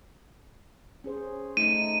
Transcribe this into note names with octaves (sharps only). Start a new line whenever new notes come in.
C#4 G#4 C5
A3 D#4 D#7